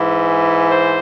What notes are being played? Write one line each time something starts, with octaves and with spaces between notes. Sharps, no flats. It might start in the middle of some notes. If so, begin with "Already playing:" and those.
Already playing: G#2 E3
C5